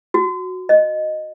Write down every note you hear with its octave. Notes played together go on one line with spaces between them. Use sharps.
F#4
D#5